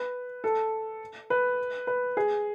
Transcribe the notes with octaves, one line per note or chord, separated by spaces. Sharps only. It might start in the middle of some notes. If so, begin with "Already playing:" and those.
Already playing: B4
A4
B4
B4
G#4